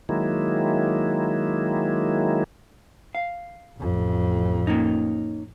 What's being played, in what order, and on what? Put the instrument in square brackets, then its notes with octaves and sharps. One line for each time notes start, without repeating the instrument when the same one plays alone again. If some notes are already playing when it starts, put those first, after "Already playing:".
[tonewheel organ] D#3 F#3 G#3 A#3 E4
[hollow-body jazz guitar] F5
[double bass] A1 F2
[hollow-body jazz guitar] A#3 C#4 D#4